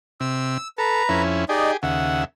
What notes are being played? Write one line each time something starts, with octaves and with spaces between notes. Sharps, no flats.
C3 E6
A4 B4 A#5
F2 C#4 E4
D#4 G4 G#4 D5 D#5
D#2 C#3 E5 F#5